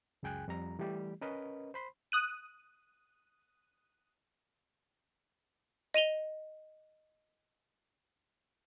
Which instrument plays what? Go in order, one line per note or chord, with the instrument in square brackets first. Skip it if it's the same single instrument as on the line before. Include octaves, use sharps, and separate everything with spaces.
[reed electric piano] C#2 F#2 G#4 G5 G#5 F#6
F2 G3 A#5
E3 G3 A3 G4
C#4 A#4 B4 D#5
C5 B5 C6
[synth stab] D#6 F#6 D#7
[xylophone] D#5 D#7 F7 G7